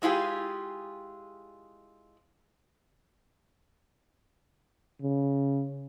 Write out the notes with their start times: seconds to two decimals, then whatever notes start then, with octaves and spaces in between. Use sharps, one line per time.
0.02 G#3 E4 F4 G4 G#4
5.02 C#3